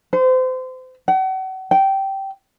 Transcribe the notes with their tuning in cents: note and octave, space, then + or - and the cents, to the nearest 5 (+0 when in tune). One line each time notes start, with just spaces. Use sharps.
C5 -30
F#5 +40
G5 -15